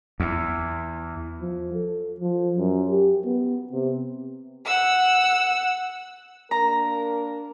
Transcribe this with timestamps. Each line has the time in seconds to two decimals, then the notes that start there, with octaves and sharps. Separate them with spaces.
0.20 E2
1.41 F3
1.74 A4
2.20 F3
2.58 F#2
2.90 G4
3.26 B3
3.72 C3
4.65 F#5 E6
6.51 A#3 D4 A#4 A#5